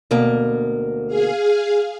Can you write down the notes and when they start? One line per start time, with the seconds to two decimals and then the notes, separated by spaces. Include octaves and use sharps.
0.11 D2 B2 A#3
1.07 G#4 F5